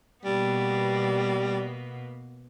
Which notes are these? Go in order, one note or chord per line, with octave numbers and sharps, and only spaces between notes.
B2 G3 A#3 B3